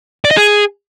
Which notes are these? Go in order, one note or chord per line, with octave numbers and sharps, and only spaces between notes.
D5
D#5
G#4